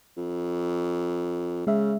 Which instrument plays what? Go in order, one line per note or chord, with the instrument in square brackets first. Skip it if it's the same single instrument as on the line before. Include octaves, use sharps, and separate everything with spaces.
[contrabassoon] F2
[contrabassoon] C#3 [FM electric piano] G#3 E5